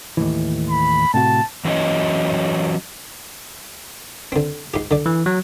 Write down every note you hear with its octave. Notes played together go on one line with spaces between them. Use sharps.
D#2 A2 E3
B5
A2 C3 F#4 A5
E3 F#3 C#4 C#5 D#5
D3 C4
G#2 G4
D3 D5
E3
F#3